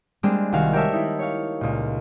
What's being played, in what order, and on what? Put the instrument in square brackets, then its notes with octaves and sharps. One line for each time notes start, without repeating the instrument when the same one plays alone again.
[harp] G3 G#3 A#3 C4 D4
C2 D#3 F#4 F5 G#5
G4 A#4 C#5 D5 E5 A5
D#4 E4
C#5 F5
C#2 A#2